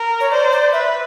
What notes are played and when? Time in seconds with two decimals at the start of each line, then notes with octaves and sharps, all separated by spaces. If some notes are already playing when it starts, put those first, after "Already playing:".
Already playing: A#4
0.20 C#5
0.32 C5 D5
0.52 D5
0.72 B4 E5